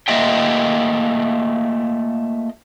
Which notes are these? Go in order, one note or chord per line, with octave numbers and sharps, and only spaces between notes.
A3 A#3 F4 D#5 E5 G5